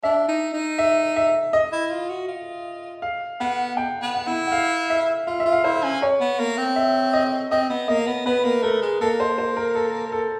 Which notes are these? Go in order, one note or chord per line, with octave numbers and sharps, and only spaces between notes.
D4 E5
D#4
D#4
E5
E5
D#5
E4
F4
F#4
F4
F5
B3 F#5
G5
B3
F#5
E4
F#5
F5
E5
F4 F5
E5
F4
F5
E4 C5
C#4
C#5
B3
A#3
C4
E5
D#5
C4 D#5
B3
A#3 D#5
B3
B3 B4
A#3
A3 A#4
G#3
A#3 A4
C5
C5
A#4
A4
A4